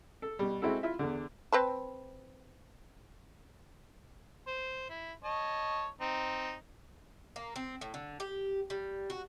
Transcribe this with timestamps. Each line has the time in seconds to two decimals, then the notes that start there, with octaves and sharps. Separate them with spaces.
0.22 A4
0.39 B2 G3
0.62 G#3 C4 E4 F#4 A4
0.83 E4 F4 E5
0.99 E2 D3
1.52 C4 B4 A5
4.47 C5
4.90 E4
5.24 C#5 D#5 A5
6.01 C4 D#4
7.36 A#3
7.56 C4
7.81 A2
7.94 D3
8.20 G4
8.70 G3
9.10 F#4